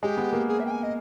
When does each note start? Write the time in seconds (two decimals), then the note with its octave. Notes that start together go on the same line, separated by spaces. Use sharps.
0.03 G#3 G4
0.17 B3
0.33 A#3
0.48 G#4
0.59 E5
0.66 G5
0.71 G#5
0.83 D#5